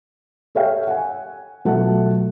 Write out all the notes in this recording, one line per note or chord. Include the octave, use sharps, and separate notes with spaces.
G4 A4 C#5 E5 F5 G5
F#5 G#5
B2 F#3 A3 F4 F#5 A5